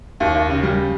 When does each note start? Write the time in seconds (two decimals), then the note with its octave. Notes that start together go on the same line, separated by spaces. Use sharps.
0.20 D#2
0.34 D#2
0.50 C#3
0.63 G3